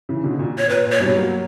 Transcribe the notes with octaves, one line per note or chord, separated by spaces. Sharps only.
C#3 E3
B2 D3
B2
A#2
C#5
A#2 B4
A#2
C#5
G2 B2
F#3 A#3